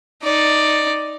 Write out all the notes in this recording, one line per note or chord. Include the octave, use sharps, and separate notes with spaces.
D#4 D5